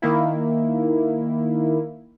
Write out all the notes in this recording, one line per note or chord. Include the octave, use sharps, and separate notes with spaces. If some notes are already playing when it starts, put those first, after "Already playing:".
D#3 A#3 E4